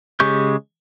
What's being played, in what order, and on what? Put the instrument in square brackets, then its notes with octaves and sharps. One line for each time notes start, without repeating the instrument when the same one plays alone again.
[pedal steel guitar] C#3 G#3 G4 C#6 G6